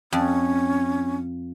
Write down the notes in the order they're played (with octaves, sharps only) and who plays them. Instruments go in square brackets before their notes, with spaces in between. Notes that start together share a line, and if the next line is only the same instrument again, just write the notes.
[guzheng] F2 [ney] C#4